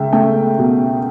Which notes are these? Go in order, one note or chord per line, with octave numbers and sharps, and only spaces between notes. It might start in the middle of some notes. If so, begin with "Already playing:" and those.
Already playing: C#2 E5 G5
A3 G5
B2